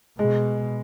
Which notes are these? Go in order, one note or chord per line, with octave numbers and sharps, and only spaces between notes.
B2 G#3